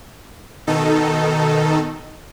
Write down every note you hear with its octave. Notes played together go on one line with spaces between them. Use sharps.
B2 D#3 D#4 A4